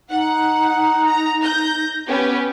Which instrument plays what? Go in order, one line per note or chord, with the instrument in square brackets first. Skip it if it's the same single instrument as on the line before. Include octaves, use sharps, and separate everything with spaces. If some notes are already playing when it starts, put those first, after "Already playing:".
[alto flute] D#4 [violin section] F#5
[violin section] A#5
G6 A#6
B3 C#4 G4